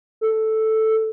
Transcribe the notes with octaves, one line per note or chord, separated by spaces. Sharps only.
A4